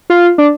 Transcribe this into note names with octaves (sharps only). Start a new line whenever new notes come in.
F4
D4